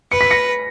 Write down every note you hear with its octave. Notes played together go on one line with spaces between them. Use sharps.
B4 C#7
B6
A#6 C#7